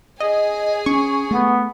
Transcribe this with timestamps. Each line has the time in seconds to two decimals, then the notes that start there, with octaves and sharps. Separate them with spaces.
0.20 G#4 D#5 G#5
0.86 C#4 C#6
1.31 A3 B3